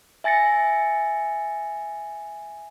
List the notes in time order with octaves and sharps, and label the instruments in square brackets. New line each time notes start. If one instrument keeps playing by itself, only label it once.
[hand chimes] E5 G#5 A6 A#6 C#7